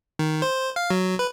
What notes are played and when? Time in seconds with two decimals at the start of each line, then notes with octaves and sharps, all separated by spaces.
0.19 D#3
0.42 C5
0.76 F5
0.90 F#3
1.19 B4